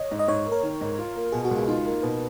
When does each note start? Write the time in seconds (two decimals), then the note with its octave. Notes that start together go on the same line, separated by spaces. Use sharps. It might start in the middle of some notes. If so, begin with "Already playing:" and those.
Already playing: C#5 D#5
0.11 G#2
0.19 D#5
0.28 G#2 C#5
0.46 A#3
0.52 A#4
0.63 D#3
0.81 G#2
0.99 F4
1.16 A#3
1.32 B2 G#4
1.45 F#4
1.51 C#2
1.56 F4
1.67 D#4 F4
1.86 A#3
2.02 B2 B4